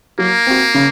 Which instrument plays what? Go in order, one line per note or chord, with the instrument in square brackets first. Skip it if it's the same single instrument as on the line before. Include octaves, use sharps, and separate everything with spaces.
[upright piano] F#3 [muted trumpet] A#3
[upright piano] C4 F#4
C#3